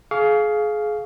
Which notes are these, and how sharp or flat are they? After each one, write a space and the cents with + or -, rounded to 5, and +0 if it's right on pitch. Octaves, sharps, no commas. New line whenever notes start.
G#4 +30 F5 +0 C#6 +45